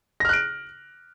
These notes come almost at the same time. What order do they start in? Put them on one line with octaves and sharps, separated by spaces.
A#6 F6 F#6 D7